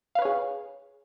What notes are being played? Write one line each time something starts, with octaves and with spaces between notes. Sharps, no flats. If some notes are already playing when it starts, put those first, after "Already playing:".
G#4 B4 C#5 F5